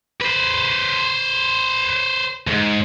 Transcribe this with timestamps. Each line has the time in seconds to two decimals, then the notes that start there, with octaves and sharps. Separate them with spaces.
0.22 B4 C5
2.47 D2 G#2